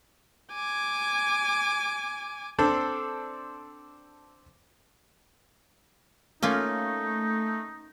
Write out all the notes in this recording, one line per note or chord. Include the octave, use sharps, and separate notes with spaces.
G#5 D6
C4 D4 A4 C5
A3 A#3 C#4 D#4 F4